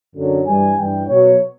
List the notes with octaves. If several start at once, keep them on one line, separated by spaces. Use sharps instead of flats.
F#2 D3 F#3
G2 E3 G3 G#5
G2 E3 G3 G5
B2 F#3 C#5